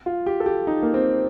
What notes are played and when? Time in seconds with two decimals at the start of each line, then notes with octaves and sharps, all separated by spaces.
0.06 F4
0.26 G4
0.40 A4
0.46 G4
0.67 D#4
0.83 A#3
0.94 C4